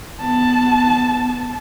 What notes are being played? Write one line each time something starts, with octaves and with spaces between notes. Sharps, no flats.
B3 A5